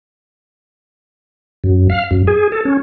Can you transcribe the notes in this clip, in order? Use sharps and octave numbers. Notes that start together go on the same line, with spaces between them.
F#2
F5
F#2
G#4
A4
C#4